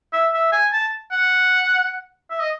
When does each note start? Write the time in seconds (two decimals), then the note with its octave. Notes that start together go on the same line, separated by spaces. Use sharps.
0.13 E5
0.34 E5
0.53 G#5
0.73 A5
1.12 F#5
2.30 E5
2.40 D#5